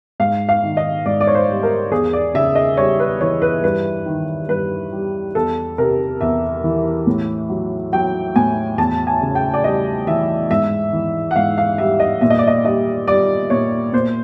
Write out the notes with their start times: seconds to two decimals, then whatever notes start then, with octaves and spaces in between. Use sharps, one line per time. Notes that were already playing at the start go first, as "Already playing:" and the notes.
0.20 G#2 F5
0.49 F5
0.63 D#3
0.77 D#5
1.06 G#2 D5
1.21 D5
1.27 C#5
1.35 C5
1.48 G3
1.63 A#4
1.91 E2 G#4
2.13 D5
2.34 C#3 E5
2.55 D#5
2.77 G3 C#5
2.99 B4
3.21 E3 C#5
3.42 B4
3.63 G2 B4
4.06 D#3
4.49 G2 B4
4.92 G3
5.35 E2 A4
5.78 C3 A#4
6.21 E2 E5
6.64 E3
7.07 A2
7.50 F#3
7.92 F#3 G5
8.36 A2 G#5
8.78 E2 A5
9.07 G#5
9.22 C#3
9.35 G5
9.54 D5
9.64 G3 D#5
10.07 E3 E5
10.51 G#2 E5
10.93 E3
11.31 F#5
11.36 G#2 F5
11.58 F5
11.78 G3 E5
12.00 D#5
12.21 A#2 E5
12.30 D#5
12.39 D5
12.48 D#5
12.64 G3 D#5
13.07 G3 D5
13.50 A#2 C#5
13.93 A#2 C5